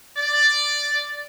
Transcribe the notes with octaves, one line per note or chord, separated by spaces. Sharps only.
D5